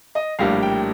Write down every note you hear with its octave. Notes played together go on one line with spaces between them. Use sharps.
D#5
A#1 A2 G3 A#3 D4 F5
G5